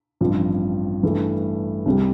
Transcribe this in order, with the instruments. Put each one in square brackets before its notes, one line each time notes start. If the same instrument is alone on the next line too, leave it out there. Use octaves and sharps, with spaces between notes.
[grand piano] A1 G2 F3 C4
G2 E3 A3 E4
C2 C3 G3